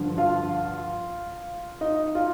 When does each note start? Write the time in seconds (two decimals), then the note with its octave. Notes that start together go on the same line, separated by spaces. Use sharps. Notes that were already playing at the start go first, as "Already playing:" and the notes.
Already playing: G2 D3 F3
0.18 F4 F5
1.81 D#4 D#5
2.15 F4 F5